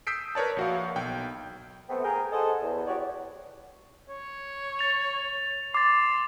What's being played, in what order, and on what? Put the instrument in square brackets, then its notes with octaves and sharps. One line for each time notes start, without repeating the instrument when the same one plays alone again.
[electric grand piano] D#6 E6 G6 B6 C7 D7
A#4 B4 C#5 D5 A5
A#1 F#4 F5
B1 G5
[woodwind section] A3 B3 C4
G#4 A#4 G5
A4 C5 D#5 F#5 G#5 A5
E2
F#4 G4 C#5 D5
[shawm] C#5
[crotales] A6 F7
[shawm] C6 [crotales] D6 A6